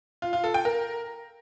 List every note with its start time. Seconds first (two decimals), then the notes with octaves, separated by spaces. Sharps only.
0.22 F4
0.33 F4
0.44 A4
0.54 G5
0.65 A#4